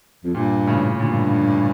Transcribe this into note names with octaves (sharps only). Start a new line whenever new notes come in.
F2
G2 A#2
A2 C#3
G2 A#2 D3